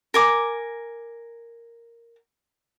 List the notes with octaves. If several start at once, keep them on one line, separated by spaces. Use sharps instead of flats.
A#4 G#5 D6